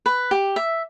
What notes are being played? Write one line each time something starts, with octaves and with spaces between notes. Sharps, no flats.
B4
G4
E5